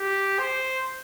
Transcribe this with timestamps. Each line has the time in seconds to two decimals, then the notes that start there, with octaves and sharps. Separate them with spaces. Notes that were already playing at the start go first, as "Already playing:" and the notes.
Already playing: G4
0.39 C5